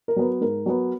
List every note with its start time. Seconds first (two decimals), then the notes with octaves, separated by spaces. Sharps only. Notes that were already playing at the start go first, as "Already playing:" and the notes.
0.08 A#4
0.16 F#3 B3
0.41 G#2 A#4
0.66 F#3 B3